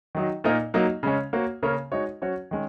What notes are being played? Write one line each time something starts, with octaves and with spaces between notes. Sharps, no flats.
D#3 F#3 D#4
A#2 A#3 D#4 A#4
F#3 A#3 D#4
C#3 G#3 C#4
A#3 F#4 C#5
C#3 A#3 C#4 A#4 C#5
G#3 D#4 F#4 C#5
F#3 C#4 F#4 C#5
D#3 G#3 C#4